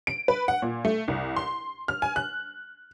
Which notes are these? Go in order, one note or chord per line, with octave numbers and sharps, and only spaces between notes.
D7
B4
F#5
A#2
A3
C2
C6
F6
G#5
F#6